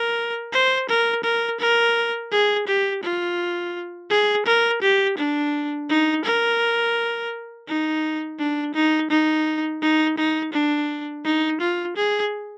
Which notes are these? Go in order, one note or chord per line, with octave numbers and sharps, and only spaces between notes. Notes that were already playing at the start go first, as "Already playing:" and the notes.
Already playing: A#4
C5
A#4
A#4
A#4
G#4
G4
F4
G#4
A#4
G4
D4
D#4
A#4
D#4
D4
D#4
D#4
D#4
D#4
D4
D#4
F4
G#4